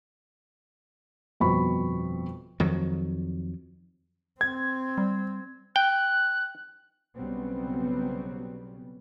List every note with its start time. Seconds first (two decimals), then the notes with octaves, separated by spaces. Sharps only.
1.40 G1 F2 B2 B5 C#6
2.60 F2 D#3 F#3
4.41 C4 G#6
4.98 G3
5.76 G5 F#6
7.16 B1 C#3 F#3 G3 B3 C4